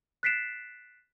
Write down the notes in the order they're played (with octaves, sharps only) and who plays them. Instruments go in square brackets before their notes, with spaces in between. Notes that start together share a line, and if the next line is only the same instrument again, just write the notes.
[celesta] F#6 A6 B6 C7 D7 E7